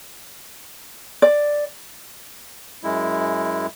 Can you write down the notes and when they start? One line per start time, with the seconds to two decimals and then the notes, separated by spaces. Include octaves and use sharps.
1.22 D5
2.83 F#2 G#3 E4